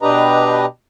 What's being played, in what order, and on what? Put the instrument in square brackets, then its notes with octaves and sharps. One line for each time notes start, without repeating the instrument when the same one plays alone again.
[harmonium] B2 D4 G4 B4 D#5 A#5